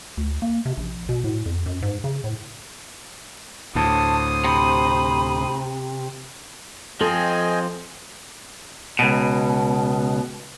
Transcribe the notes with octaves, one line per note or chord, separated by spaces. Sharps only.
D2
A#3
C3
A#1
B2
A2
F2
F#2
G#2
C#3
A2
D2 A2 C5 A5 D#6
C3 B5
F3 C4 A4 D#5 G5 G#5
C#2 B2